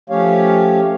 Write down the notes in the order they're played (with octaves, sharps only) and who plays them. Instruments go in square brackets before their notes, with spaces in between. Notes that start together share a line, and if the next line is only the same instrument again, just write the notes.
[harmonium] F3 A3 C#4 G4 C#5 F5